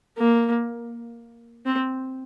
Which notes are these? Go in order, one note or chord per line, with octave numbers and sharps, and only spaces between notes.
A#3
C4